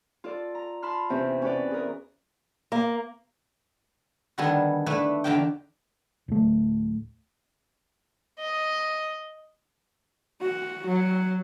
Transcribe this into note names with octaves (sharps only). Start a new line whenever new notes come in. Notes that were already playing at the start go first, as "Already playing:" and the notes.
F4 A4 D5
A#5
A5 B5 C6 F6
E2 C3 C4 C#4
C#4 F#4 B4 D5
G#4 A#4
A#3
D3 D#3 G3 B3 G#4 A4
A3 D4 E4 A4 B4
E2 D3 D#3 D4 G4 G5
D1 A3
D#5
F#4
F#3